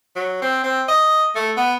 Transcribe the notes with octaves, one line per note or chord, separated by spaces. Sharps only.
F#3
C4
C4
D#5
A3
B3